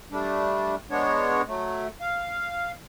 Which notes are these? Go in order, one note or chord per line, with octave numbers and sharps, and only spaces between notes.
G3 A3 D4
G#3 B3 D4 C#5
F#3 A3
F5